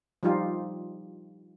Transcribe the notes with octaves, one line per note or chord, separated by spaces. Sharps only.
F3 G3 D#4 F4 G4